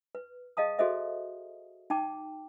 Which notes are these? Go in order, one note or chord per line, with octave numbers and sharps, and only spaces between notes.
B4
G#4 D#5 F5 A5 D#6
F#4 G#4 A4 C5 D#5 E5
D#4 G5 A5 D6